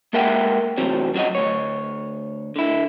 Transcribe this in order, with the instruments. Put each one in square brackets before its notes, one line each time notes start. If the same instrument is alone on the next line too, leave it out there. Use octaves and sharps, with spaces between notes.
[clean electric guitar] G#3 A#3 A#4 E5 F#5 G5
E2 A2 C3 F#3 C4
F#2 F#3 F#4 D#5
D2 C#5
D3 E4